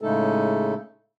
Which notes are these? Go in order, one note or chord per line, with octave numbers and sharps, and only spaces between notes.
A2 C#3 G#3 A3 D#4 A4